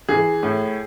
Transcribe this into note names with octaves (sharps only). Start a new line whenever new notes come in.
E3 G#4
A2